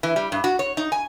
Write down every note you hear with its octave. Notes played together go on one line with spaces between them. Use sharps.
E3
G3
G2
F#4
C#5
D#4
G#5